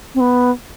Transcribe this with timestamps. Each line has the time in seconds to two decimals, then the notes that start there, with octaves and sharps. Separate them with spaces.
0.15 C4
0.20 B3